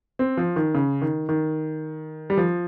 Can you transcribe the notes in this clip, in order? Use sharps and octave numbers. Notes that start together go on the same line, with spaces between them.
C4
F3
D#3
C#3
D#3
D#3
G3
F3